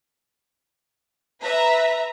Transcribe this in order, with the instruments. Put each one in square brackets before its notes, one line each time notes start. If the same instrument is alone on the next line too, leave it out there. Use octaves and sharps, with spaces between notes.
[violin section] B4 E5 A#5